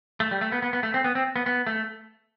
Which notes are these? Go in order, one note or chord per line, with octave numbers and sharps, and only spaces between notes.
A3
G3
A3
B3
B3
B3
A3
C4
B3
C4
B3
B3
A3